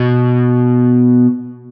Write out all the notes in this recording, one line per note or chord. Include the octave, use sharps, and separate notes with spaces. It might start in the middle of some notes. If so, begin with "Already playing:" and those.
Already playing: B2